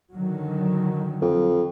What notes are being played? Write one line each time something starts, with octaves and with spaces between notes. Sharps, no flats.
D3 D#3 F#3
F2